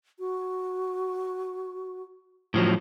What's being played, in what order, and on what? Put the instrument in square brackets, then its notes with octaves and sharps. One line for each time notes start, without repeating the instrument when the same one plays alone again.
[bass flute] F#4
[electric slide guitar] A2 F3 F#3